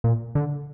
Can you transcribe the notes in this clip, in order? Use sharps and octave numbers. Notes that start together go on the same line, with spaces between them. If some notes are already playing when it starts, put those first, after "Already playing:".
A#2
D3